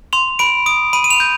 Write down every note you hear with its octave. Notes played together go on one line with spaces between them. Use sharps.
C6 F7
B5 D7
D#6 D7
B5 D#7
D#7
F7
G6